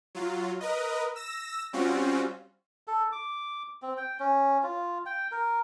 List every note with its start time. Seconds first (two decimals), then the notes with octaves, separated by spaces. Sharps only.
0.15 F#3 F4
0.61 A#4 B4 D#5
1.16 E6 A#6 E7
1.73 G3 C4 C#4 F4 F#4
2.88 A4
3.12 D6
3.82 C4
3.97 G5
4.19 C#4
4.63 F4
5.06 G5
5.31 A#4